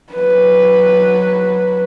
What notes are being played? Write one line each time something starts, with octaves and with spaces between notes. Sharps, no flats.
F#3 B4